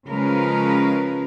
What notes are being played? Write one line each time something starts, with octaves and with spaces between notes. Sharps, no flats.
C#3 F3 G#3 C#4 A#4 B4